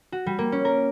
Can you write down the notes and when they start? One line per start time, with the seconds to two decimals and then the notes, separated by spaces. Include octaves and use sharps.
0.12 F#4
0.26 G3
0.39 A#3
0.52 C#4
0.65 A#4